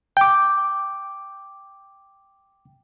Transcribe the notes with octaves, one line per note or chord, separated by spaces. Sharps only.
G5 D6